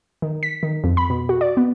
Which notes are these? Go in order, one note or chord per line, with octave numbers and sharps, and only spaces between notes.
D#3
B6
D#3
F2
B5
B2
F#4
D5
B3